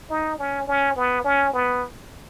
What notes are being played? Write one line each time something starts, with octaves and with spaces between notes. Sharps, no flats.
D#4
C#4
C#4
B3
C#4
B3